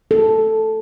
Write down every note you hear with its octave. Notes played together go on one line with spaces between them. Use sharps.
A4